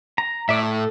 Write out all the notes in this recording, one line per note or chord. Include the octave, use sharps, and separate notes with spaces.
A#5
A2 D5 E5
A4